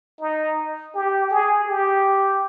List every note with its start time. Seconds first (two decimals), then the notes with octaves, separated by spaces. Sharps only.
0.21 D#4
0.94 G4
1.31 G#4
1.68 G4